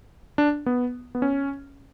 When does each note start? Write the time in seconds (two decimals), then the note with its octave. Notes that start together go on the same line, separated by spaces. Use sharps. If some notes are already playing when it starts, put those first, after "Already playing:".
0.38 D4
0.66 B3
1.15 B3
1.22 C#4